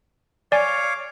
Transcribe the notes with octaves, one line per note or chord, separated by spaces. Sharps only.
C#5 D5 F5 G#5 D6